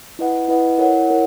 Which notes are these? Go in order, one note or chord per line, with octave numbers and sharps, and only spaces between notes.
E4 B4 D#5 F#5
E4 B4 D#5 F#5
E4 A#4 C#5 F#5
E4 A#4 C#5 F#5